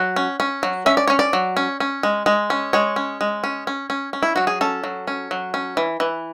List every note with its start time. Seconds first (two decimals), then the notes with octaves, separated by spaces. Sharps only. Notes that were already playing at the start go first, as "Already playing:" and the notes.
Already playing: F#3 F#5
0.16 C#4
0.40 C#4
0.63 F#3
0.86 C#4 E5
0.97 D5
1.07 C#4 C#5
1.19 D5
1.33 F#3
1.57 C#4
1.80 C#4
2.03 G#3
2.26 G#3
2.50 C#4
2.73 G#3 C#5
2.96 C#4
3.21 G#3
3.44 C#4
3.67 C#4
3.90 C#4
4.13 C#4
4.23 E4
4.36 F#3 F#4
4.47 G#4
4.61 C#4 A4
4.84 F#3
5.08 C#4
5.31 F#3
5.54 C#4
5.77 E3
6.00 E3